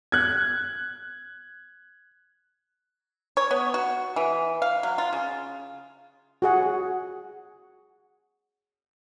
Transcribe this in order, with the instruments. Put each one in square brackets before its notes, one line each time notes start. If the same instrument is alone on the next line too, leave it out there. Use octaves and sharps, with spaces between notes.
[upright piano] F#6 G#6
[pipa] C#5
B3
F#4
E3
F5
F#3
F4
C#3
[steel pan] F#4 G#4 F#5